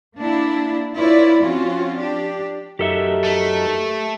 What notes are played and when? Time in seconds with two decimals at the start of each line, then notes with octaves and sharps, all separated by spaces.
0.16 A#3 D4 E4
0.96 E4 F4 B4 C#5 D5
1.42 F3 C4 C#4 F4 F#4
1.96 D4 G4
2.79 F#2 D#4 G4 A4 A#4 E5
3.24 A3